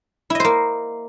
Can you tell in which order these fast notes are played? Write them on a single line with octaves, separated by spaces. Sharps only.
E4 D#5 C5 A#3